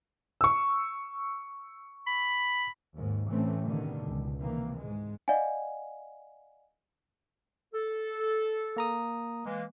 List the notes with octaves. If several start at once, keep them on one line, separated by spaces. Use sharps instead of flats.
C#6 E6
B5
D#2 G#2
A2 E3 A3 C4 C#4
G2 B2 D3 D#3
C#2
C3 D#3 E3 A#3
G#2 G#3
D5 D#5 F5 F#5 G#5
A4
A#3 A#5 D#6
E3 G#3 A#3